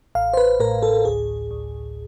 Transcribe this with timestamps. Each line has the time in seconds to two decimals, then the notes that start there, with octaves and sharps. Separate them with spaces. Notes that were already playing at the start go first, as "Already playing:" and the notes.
0.15 A1 F5
0.33 C5
0.37 B4
0.60 A2 A#4
0.83 A4
1.05 D2 G#4
1.51 D2